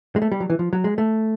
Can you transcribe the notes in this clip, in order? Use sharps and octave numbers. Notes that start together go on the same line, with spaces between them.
G#3
A3
G3
F#3
E3
F3
F#3
G#3
A3